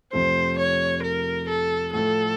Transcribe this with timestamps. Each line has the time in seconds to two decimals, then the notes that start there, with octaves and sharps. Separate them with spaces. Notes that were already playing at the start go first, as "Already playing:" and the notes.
0.13 F2 C3 F3 A3 C5
0.59 C#5
1.03 A#4
1.49 A4
1.93 A2 F3 A3 A4